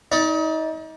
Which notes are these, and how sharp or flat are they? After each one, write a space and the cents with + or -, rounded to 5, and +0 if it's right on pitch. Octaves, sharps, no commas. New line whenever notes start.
D#4 +35 D5 +0